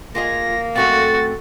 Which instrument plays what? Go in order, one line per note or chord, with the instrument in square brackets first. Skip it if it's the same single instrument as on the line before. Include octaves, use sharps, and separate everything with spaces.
[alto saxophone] A#3 [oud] F4 G#4 D#5 [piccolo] A#6
[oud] F#2 A3 C4 [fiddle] F#4 [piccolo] A6